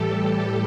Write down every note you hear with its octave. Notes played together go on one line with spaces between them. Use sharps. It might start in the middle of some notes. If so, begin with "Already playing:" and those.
Already playing: A2 E3 G3 G4 A4
G4